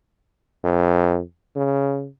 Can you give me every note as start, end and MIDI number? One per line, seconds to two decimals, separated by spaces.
0.64 1.20 41
1.55 2.07 49